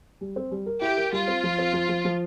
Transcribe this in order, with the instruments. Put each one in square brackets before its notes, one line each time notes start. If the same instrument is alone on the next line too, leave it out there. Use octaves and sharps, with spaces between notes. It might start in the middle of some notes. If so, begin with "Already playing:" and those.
[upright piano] G3
C4
G3
A#4
[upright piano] E4 [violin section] G4
[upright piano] A#4
[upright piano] G3 [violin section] F4
[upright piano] C4
F3
C4
F3
F3
F3